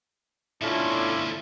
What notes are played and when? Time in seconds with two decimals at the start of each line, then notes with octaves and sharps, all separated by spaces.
0.62 D2 B2 C#4 D4 E4 F4 A4